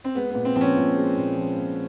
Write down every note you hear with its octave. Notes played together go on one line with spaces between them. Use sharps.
C4
G#3 B3
A#2 B3
C4
F3 C4
C#4
A#2
G#3
A#2
F3
A#2